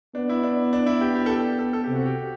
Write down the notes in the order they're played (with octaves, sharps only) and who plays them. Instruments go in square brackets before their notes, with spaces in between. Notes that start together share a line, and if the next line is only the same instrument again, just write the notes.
[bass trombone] B3 [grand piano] D4
[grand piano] E4
D4
D4
E4
[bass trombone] B3 [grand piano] G4
[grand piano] G4
A4
G4
A4
A4
[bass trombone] C3 [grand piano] G4
[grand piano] F#4
G4